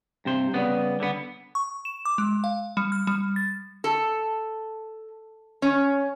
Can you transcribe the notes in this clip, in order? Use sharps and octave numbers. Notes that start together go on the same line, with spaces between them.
G2 C3 C5
C#3 G3 B3
D3 B3
C#6
E7
D6
G#3
F5
G3
F6
G3
A6
A4
C#4